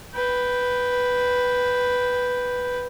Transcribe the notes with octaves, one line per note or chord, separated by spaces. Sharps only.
B4 G5